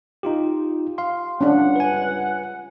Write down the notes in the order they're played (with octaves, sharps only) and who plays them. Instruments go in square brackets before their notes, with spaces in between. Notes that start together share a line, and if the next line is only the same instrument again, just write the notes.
[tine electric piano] D#4 F4 G4
F5 C6
[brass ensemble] C#2 G2 F#5 [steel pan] C#4 D4
[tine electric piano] B4 G#5